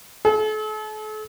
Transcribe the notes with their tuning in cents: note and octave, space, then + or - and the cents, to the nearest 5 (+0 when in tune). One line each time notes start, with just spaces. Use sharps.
A4 -40